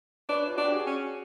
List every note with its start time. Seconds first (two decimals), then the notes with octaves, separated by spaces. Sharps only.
0.29 D4 B4 C#5
0.47 F4
0.55 D4 F#4
0.64 G4
0.72 F#4 G#4
0.87 C#4